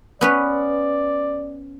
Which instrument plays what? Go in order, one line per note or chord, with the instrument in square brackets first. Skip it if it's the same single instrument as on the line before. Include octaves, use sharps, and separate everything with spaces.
[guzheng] B3 C#4 B4 [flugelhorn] D5